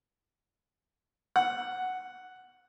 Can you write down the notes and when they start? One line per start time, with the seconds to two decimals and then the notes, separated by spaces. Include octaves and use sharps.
1.36 F#5